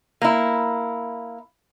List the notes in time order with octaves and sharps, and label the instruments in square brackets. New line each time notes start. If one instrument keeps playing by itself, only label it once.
[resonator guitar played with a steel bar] A#3 E4